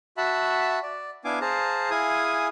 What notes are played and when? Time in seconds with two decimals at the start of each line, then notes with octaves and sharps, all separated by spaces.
0.17 F#4 E5 F#5 A5 B5
0.83 D5
1.25 B3 D4 E4 F5 G#5 D6
1.41 G#4 C5 F5 A5 A#5
1.90 E4 G#4 F5 G#5 D#6